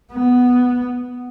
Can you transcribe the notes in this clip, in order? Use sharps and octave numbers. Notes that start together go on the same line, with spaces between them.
B3